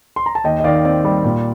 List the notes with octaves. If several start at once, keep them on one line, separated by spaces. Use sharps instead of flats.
C6
A#5
A5
D#2 D#5 G5
D#5
D#3 D5 F5
C4 D5
G3
A#2